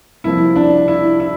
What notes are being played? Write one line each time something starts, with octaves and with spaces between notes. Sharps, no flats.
C2 C3 F3 A#3 E4
D4
E4
E4